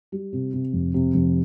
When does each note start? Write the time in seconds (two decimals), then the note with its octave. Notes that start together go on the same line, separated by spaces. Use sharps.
0.12 G3
0.33 C3
0.53 C3
0.73 F1
0.94 C3
1.14 F1